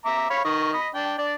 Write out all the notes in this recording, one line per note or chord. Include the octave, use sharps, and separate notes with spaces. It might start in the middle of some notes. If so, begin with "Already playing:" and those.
E5 A#5 D6
C#5 F5 B5
D#3 D#5 C#6
D#5 B5
D4 G5
D4 D5